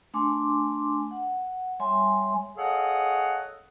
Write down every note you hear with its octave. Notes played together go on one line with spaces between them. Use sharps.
A3 D4 G#5 C6 D6
F#5
G3 C#5 E5 G#5 C6
G#4 A4 C#5 D#5 F5 F#5